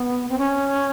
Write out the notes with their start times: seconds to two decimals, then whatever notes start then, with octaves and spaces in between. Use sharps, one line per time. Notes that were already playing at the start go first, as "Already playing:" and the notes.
Already playing: B3
0.29 C4
0.38 C#4